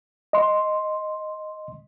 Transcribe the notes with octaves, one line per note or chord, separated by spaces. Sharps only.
D#5 C6